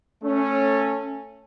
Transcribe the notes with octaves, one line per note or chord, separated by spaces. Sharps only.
A3 C#4